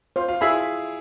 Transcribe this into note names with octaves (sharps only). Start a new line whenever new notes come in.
F4 C5
F4
E4 G#4 E5 B5